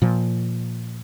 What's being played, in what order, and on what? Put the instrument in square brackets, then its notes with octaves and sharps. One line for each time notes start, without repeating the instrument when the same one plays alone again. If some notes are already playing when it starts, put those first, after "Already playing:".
[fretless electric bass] A#2 F3